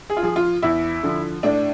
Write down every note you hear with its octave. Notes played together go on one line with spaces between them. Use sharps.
G#4
F4
F3 G#4
F4
E2 E4
D3 F3
A2 D4